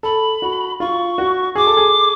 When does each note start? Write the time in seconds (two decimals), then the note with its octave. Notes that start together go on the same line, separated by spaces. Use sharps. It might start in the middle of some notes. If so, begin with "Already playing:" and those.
0.03 A4 B5
0.42 F#4
0.80 F4 C#6
1.18 F#4
1.55 G#4 D6
1.67 A4
1.77 G#4